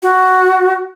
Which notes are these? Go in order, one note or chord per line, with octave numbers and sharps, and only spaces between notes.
F#4